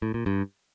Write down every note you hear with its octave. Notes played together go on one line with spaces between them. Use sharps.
A2
A#2
G2